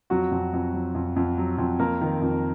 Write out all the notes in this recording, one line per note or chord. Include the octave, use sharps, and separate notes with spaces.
F2 F#3 F#4
F2
F2
F#3
F2
F2
F#3
F2
F2 A#3 A#4
D#3
F2